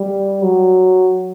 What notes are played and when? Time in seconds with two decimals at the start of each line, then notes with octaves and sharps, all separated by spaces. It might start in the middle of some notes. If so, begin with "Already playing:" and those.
Already playing: G3
0.43 F#3